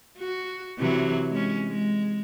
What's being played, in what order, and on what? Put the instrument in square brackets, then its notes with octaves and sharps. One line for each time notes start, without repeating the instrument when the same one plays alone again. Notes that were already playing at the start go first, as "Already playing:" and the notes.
[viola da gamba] F#4
C3 E3 F#3
G#3 C#4
G#3